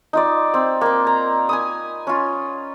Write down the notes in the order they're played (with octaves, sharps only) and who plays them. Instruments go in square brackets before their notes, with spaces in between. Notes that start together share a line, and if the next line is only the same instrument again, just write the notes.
[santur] D#4 F4 D5
C4
A#3 C6
A#5
G#5 B5 D#6
C#4 F4